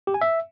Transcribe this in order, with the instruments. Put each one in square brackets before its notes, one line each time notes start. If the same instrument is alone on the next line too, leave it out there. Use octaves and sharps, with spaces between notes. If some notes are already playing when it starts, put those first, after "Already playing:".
[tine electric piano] G4
G#5
E5